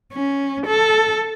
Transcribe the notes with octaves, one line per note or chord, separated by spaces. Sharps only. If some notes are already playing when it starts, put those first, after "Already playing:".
C#4
A4